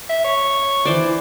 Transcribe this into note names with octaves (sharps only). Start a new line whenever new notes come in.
E5
C#5
E3 C5 D5